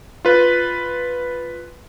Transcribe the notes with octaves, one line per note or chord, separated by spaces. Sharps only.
F4 B4